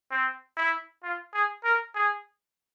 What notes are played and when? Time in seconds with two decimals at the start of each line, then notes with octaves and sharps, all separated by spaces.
0.11 C4
0.57 E4
1.03 F4
1.34 G#4
1.64 A#4
1.95 G#4